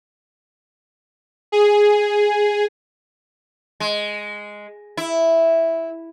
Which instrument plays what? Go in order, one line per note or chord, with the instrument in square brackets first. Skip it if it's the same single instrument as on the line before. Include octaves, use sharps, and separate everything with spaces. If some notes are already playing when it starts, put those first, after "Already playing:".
[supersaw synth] G#4
[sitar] G#3
E4